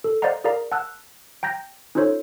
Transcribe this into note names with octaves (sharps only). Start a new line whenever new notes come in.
A4
C5 D5 D#5 F5 F#5 A#5
G#4 A#4 D5 F5 A#5
F#5 A5 E6 F#6
G5 A#5 G6 A#6
C#4 D#4 F4 A4 C5 C#5